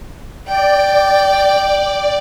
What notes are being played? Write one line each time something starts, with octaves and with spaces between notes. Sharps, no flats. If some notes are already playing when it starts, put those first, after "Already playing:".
D5 G5